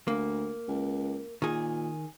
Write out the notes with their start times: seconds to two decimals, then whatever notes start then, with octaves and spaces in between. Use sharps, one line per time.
0.08 D2 A#3
0.68 C#2
1.42 A#2 D#3 G#4